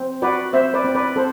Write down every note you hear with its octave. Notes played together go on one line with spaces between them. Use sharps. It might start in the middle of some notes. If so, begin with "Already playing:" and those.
Already playing: C4
F#4 B4 D5
C4 C5 E5
B4 D5
C4
B4 D5
C4 A4 C5